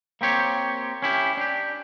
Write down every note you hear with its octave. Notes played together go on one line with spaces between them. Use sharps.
A#3 C4 G4 C#5
C#4 E4 G4
D4 G4